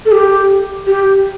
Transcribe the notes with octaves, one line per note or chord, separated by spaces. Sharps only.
A4
G4
G4